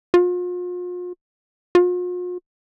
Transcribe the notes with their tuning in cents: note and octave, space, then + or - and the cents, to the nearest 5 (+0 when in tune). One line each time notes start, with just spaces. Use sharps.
F4 +40
F4 +45